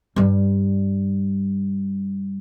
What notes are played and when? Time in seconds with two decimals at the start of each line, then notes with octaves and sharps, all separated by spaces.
0.16 G2 G3